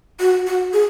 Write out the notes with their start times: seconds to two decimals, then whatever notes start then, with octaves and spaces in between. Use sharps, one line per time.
0.20 F#4
0.47 F#4
0.73 G#4